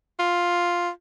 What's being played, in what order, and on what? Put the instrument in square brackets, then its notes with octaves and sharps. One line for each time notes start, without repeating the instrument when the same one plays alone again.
[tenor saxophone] F4